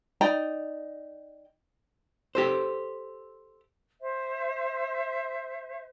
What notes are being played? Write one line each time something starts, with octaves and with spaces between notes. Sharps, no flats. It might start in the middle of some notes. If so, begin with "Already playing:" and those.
D#4 D5 G5 A#5
G4 A4 C5
C5 E5